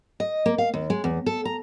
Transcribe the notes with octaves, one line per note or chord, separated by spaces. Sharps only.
D#5
A#3
F5
D#2
G#3
E2
A4
A#5